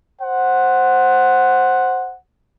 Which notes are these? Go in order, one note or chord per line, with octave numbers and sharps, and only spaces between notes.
C5 F#5